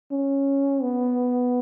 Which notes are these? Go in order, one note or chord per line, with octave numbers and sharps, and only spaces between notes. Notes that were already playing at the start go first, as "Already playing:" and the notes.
C#4
B3